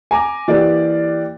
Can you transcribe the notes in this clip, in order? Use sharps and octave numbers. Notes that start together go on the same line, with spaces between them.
G#5 A#5 D6
E3 A#3 G4 D5